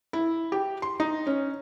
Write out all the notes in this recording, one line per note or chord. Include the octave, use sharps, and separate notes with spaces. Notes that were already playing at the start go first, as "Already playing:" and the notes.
E4
G4
C6
D#4
C#4